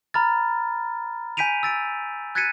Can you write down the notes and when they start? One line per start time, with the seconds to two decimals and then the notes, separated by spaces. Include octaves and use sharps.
0.14 A#5 B5 F6 A6
1.37 G#5 G6 B6 D7 D#7 F7
1.63 E6 A6 D7
2.35 F#6 G#6 A6 B6 C#7 D#7